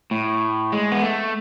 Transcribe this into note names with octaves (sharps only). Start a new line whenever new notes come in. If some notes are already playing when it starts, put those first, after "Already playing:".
A2
G#3
B3
A3